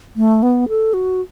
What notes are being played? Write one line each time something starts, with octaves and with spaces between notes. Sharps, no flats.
A3
B3
A4
F#4